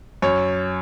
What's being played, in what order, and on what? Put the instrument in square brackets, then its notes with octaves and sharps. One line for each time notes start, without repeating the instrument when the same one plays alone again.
[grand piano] F#2 C#5